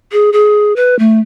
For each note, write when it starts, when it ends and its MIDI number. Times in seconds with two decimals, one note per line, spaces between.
0.12 0.30 68
0.33 0.75 68
0.76 0.97 71
0.99 1.20 57